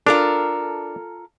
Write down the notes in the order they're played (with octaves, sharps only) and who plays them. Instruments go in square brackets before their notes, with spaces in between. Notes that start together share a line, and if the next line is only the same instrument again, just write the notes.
[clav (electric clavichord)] D4 [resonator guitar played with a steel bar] F4 A4 A#4